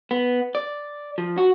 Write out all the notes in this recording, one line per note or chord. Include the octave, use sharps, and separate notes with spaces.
B3
D5
F3
F#4